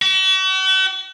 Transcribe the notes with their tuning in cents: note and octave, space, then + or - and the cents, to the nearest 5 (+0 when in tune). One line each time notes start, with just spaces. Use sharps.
F#4 +45